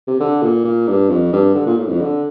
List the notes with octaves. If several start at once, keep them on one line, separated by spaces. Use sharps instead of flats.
C3
D3
A#2
A#2
G2
F2
G2
D3
A#2
A2
F2
D3